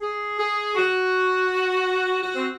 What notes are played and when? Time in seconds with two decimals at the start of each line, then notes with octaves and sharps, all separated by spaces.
0.01 G#4
0.38 G#4
0.75 F#4
2.21 F#4
2.34 C4